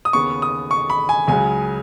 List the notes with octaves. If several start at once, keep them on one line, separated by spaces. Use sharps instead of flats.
D#6
D#2 C#3 B3 C#6
D#6
C#6
B5
G#5
C#2 C#3 F#3 G#5